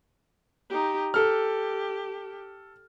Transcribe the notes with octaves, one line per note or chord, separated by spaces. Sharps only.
D#4 G4
G4 A4 F6